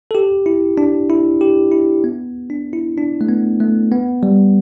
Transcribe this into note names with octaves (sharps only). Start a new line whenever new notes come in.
A4
G4
E4
D4
E4
G4
E4
B3
D4
E4
D4
A3
B3
A3
B3
G3